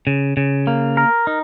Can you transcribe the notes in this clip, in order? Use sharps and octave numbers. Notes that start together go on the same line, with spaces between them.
C#3
C#3
A#3
A#4
D#4